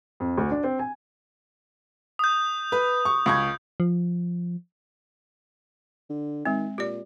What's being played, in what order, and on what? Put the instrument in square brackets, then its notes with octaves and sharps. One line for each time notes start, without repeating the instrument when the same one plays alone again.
[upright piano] F2
D2
D4
C4
G#5
[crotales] D#6 G6
[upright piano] B4
C#6
C#2 C#6 G#6
[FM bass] F3
[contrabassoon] D3
[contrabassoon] D#3 [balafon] G#3 C4
[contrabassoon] A#2 [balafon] G4 D5